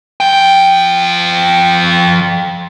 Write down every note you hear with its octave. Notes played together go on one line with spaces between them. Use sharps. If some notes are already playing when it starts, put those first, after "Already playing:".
F3 G5